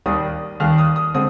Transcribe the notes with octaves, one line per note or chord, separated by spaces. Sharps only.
D#2 D#3 G3 D#6
D#2 D#3 G3 F6
D#6
D#6
D3 G#3 C4 D#6